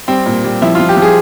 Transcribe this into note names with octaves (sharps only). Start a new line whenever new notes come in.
G3 C4
A#2
G3
F3 E4
F3 F4
G4
F3
G#4